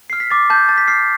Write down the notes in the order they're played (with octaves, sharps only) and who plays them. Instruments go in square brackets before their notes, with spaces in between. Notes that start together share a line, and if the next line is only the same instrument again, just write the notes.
[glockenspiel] F6 C7
B6
D6 A6
A5 G6
A5 A6
B6
F6 C7